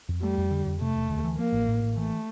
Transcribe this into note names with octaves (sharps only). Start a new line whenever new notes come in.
F2
G3 A3
F2
D3
F2
C3 A3
E1
D2
E3
F3 A#3
A1
A2
A1
E3 A3